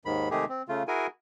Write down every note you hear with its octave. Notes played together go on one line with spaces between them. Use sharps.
D#2 G#2 D#3 B5
C3 D#3 G#3 A3 G4 G#4
C4
C#3 A3 F4
E4 F#4 G#4 A#4 G#5